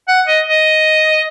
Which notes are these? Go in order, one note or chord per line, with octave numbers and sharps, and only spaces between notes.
F#5
D#5
D#5